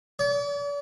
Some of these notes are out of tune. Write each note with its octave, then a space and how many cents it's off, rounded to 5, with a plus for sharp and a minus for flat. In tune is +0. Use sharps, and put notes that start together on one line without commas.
D5 -40